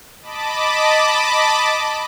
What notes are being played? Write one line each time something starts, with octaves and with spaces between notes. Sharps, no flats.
D#5 A5 B5 D6